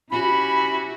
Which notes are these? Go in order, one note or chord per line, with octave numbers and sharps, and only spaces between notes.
C#4 E4 F#4 G4 B5